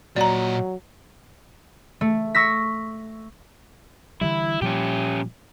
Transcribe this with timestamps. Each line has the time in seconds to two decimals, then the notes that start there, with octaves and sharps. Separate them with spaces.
0.16 A#2 F#3 D5 D#5 A#5
2.01 A3
2.35 C#6 E6 A#6 B6
4.21 D3 E3 G3 E4
4.62 A#2 F3 G3 C#4 G4